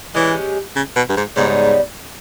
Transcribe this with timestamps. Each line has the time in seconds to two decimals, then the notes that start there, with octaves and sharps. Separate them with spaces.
0.14 E3 G#3 C#4 G4
0.76 C#3
0.96 B2
1.09 G2
1.17 G#2
1.36 G#2 C#3 G3 B3 D#4